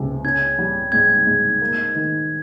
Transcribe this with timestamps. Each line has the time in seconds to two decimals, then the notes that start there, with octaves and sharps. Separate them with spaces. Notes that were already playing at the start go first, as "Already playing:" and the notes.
Already playing: C#2 C3
0.24 C#4 G#6
0.59 G3
0.92 G#2 G#6
1.27 G#2
1.61 A#3
1.95 D#3